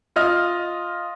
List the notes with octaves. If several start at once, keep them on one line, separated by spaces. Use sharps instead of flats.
F4 D#5 F6